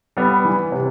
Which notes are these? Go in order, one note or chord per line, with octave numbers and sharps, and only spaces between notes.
G3 B3
E3
C3